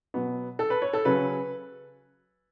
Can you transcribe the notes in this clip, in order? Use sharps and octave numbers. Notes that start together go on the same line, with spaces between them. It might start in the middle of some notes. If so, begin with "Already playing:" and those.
B2 F#3 B3
A4
B4
C#5
A4
C#3 F#3 C#4 B4